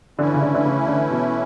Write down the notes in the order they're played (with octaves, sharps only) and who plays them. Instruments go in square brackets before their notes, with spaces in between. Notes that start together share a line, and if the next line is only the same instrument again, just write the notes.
[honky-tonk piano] D3 [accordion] E3 A3 C#4 E4
[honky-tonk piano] C#3
D3
D3
C#3
D3
B2